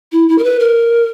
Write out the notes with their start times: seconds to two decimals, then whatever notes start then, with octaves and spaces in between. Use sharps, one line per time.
0.12 E4
0.29 E4
0.38 A#4
0.44 B4
0.59 A#4